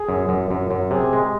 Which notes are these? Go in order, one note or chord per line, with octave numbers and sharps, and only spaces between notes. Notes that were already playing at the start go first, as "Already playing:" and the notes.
Already playing: G#4
F#2
F#2
F#2
F#2
C3 G#4
G#3